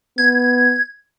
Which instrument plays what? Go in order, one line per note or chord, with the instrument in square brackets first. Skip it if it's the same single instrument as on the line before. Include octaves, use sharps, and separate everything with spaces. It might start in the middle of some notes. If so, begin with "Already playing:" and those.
[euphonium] B3 [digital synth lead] G#6